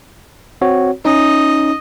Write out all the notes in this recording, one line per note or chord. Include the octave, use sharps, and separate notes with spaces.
C4 F#4 C#5
C#4 D#4 D#5